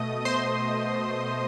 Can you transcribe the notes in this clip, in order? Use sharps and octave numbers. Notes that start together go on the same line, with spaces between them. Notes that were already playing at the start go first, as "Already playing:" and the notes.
Already playing: B2 A3 D#5 D#6
C5 C6